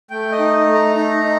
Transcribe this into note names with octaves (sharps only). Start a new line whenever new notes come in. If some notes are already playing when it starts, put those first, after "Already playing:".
A3 G5
D#5
D#4
A3
A#5
D#4
D#4